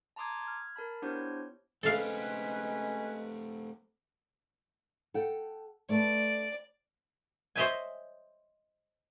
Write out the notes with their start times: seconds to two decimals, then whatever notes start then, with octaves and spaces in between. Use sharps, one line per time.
0.16 A5 A#5 C6 D6 D#6 G#6
0.43 F6 G#6
0.76 A#4 A5 B5
1.02 B3 D4 E4 G4 C5 C#5
1.83 G#3 A3 C4 C#4 A4 B4 F5
5.14 A4 F#5 G5
5.89 A3 B4 D5 A5
7.55 C5 C#5 D#5 E5 G5 G#5